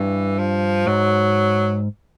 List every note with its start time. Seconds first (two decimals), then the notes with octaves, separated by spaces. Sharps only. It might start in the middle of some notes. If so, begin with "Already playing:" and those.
Already playing: G2 E3
0.39 F3
0.87 G#2 F#3